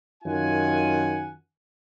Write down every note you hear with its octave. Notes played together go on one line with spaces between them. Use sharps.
F#2 D#3 F4 F#5 G#5